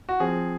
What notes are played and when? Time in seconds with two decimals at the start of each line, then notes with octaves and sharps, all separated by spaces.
0.09 F#4
0.20 F3 C4 G#4